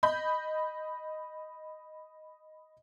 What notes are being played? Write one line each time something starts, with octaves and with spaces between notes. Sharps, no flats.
D#5 B5 G6